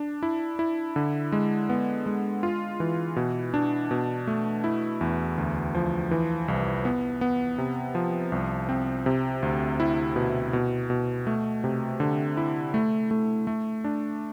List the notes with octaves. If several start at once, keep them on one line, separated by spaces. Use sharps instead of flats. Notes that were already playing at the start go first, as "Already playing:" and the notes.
Already playing: D4
E4
E4
D3
G#3
B3
G#3
F4
E3
B2
D4
B2
A3
E4
E2
D2
F3
E3
C2
B3
B3
C3
F3
C2
C4
C3
D2
E4
B2
B2
B2
A3
C3
D3
E4
A3
A3
A3
D4